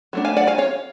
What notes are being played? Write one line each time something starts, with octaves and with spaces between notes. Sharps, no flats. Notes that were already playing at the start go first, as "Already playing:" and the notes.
F#3 A3 D4
F5 G#5
D5 F#5
F5 G#5
C#5 F5